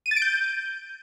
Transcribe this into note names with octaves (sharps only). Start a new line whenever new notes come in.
D#7
A6
D7
G6